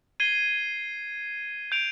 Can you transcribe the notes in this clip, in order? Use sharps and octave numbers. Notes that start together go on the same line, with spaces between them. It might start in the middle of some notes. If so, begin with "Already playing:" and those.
G#6 C7 D#7 G7
G6 D7 F7